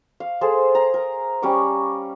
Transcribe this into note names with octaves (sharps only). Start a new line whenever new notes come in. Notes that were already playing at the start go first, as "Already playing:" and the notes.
F5
G#4 A4 C5 A5
A#5
A#4
G3 C#4 C#6 D6